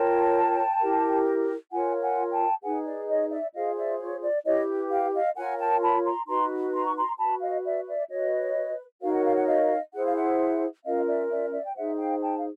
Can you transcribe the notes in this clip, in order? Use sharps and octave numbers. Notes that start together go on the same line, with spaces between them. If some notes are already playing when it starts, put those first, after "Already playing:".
Already playing: F4 A#4 C#5 G5 A5
E4 G4 A#4
F4 A#4 C#5 F#5 G#5
F#5 G#5
G5 A5
D#4 G#4 B4 F#5 G#5
D5
C#5 D#5
D5 E5
F4 G#4 C5 D#5 F5
D5 E5
C#5
D5
E4 G4 B4 C#5 D#5
F5 G5
D#5 F5
F4 A#4 C#5 F#5 G#5
G5 A5
A5 B5
A#5 C6
D#4 F#4 B4 A#5 C6
A#5 C6
C#6
A#5 C6
F#4 B4 A5 B5
D#5 F5
D5 E5
D5 E5
F#4 B4 C#5 D#5
D#4 F#4 A#4 C#5 F5
F#5
F5
F#5
D#5 F5
E4 G#4 C5 F#5
F5
E5 F#5
C#4 F4 A#4 D#5 F5
D5 E5
D5 E5
D5 E5
G5
D#4 G#4 C5 E5 F#5
F5 G5
G5 A5
F5